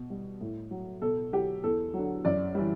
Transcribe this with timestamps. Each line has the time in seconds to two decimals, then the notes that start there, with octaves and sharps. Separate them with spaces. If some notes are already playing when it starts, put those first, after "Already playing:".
Already playing: B2
0.10 G3
0.41 A2
0.71 F#3
1.01 B2 A4
1.33 F#3 G4
1.64 E2 A4
1.94 F#3
1.99 D3
2.25 F#2 D5
2.55 E3 G3